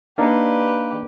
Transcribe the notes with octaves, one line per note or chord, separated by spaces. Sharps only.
A#3 D4 D#4 G4 B4 D5 F5 A#5